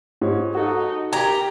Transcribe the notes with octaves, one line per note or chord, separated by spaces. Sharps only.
G#2 C#5
D#4 F#4 A4 F#5
G4 A#4 A#5 G#6